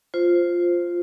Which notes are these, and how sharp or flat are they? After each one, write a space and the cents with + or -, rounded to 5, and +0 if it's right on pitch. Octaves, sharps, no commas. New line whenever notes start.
F4 +0 C5 +0